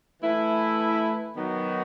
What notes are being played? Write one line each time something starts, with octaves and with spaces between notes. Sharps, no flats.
E3 A3 E4
D#3 F#3 B3 D#4 F#4